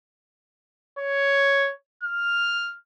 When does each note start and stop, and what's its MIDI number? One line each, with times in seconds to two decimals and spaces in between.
0.99 1.72 73
2.03 2.73 89